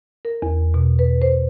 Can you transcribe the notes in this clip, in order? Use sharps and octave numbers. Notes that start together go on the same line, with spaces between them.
A#4
E2
B2
B4
C5